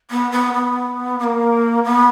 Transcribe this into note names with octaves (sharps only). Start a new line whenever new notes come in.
B3
B3
B3
B3
A#3
B3